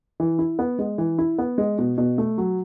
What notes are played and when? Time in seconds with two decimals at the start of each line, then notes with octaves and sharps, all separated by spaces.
0.20 E3
0.39 E4
0.59 B3
0.79 G#3
0.98 E3
1.18 E4
1.38 B3
1.58 G#3
1.78 B2
1.98 B2
2.18 A3
2.38 F#3